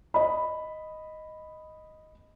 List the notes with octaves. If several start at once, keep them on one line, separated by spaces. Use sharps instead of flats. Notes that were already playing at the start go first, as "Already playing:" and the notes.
D#5 B5